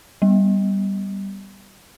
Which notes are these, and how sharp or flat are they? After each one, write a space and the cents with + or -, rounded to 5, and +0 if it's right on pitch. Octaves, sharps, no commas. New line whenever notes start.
G3 +0 B3 +0